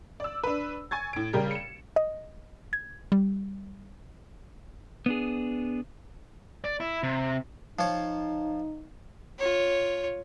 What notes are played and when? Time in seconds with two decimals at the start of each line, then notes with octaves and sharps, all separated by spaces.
0.20 D5 E6
0.43 D4 B4
0.91 G#5 C#6 G#6 A6
1.13 A2 D7
1.33 C#3 G3 G4 A#4
1.51 C#7 E7
1.96 D#5
2.73 G#6
3.12 G3
5.06 B3 D4 G#4
6.64 D5
6.80 E4
7.03 C3
7.79 F3 D#4 C#5
9.39 F4 C#5